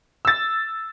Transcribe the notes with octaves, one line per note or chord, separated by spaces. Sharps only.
E6 A6